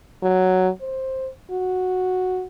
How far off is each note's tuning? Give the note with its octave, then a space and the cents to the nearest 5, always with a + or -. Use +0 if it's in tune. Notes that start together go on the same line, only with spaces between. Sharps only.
F#3 +5
C5 +10
F#4 -5